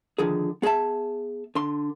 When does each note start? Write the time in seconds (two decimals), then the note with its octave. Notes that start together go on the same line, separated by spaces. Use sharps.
0.18 D3 D#3 F3 G#4
0.62 B3 G#4 D#5 E5 A5
1.55 D3 C6